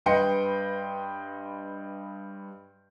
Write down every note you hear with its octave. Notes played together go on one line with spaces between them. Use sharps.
G2 B4 D#5 G5 C6 C#7